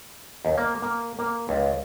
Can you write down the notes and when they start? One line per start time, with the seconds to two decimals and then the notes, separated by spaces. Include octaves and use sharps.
0.45 D#2
0.58 A#3
0.82 A#3
1.19 A#3
1.49 C#2